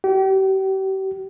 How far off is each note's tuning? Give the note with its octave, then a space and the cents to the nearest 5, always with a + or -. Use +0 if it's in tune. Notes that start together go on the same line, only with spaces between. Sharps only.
G4 -40